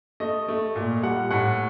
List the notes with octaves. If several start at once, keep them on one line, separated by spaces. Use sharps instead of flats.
A3 D#5
A3
A#2
G3 F#5
A2 F#5